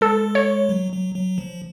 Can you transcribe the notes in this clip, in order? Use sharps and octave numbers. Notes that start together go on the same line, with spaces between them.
G#3 A4
C#5
F#3
F#3
F#3
F3